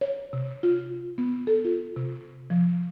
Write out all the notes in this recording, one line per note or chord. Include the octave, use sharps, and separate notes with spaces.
C#5
C3
F4
B3
A4
F4
C3
F3